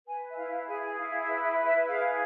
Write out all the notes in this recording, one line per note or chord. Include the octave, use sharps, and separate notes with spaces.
B4 G#5
E5
E4 F5
G#4 G#5
G#5
E4 F5
E5
B4
E5
E4
E5
G#4 F5